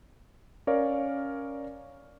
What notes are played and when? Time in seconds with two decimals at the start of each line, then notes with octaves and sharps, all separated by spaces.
0.67 C#4 A#4 C#5 D5 F5